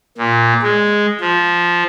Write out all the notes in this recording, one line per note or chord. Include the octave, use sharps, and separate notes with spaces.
A#2
G#3
F3